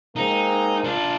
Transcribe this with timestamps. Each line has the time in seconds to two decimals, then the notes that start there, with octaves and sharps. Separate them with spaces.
0.16 G#3 A#3 C4 D#4
0.84 D4 F4